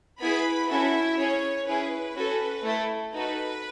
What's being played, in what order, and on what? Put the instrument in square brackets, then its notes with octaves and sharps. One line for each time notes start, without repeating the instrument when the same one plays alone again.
[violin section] B3 E4 G#4 B4 B5
C#4 E4 F#4 A4 E5
C#4 G#4 C#5
C#4 E4 G#4 B4
C#4 F#4 A4
A3 E4 A4
D#4 F#4 A4 B4